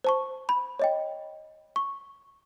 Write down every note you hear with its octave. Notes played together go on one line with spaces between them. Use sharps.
C5 A5 C#6
B5
C#5 D#5 G5
C#6